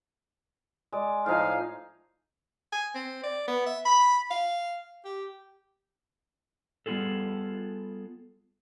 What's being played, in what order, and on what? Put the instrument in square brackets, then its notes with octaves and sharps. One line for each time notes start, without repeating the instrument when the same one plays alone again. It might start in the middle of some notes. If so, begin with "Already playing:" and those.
[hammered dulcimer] G#3 D5
[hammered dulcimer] A2 D#4 G#5 [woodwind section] F3 F5
[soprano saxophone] G#5
C4
D5
B3
E5
B5
F5
G4
[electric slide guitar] G3 B3 C4 F4 G#4 A4